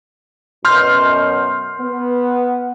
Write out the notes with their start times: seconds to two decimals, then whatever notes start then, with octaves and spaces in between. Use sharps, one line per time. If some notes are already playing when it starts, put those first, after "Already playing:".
0.65 F#2 B2 C6 F6 G6
1.80 B3